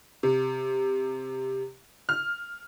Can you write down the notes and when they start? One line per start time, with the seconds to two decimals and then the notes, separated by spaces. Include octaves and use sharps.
0.23 C3
2.09 F6